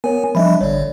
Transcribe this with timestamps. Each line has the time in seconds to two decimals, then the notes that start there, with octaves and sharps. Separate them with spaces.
0.04 B3 A#4 C#5 G#5
0.35 F3 G3 D4 D#5 E5 B5
0.61 A1 D3 C#5 D5